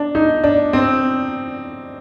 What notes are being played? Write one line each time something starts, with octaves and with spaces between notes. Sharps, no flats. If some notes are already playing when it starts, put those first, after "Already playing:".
Already playing: D4
D#4
D4
C4